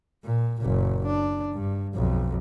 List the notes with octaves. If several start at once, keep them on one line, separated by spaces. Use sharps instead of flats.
A#2
F#1 A#2
D4
G2
B1 F2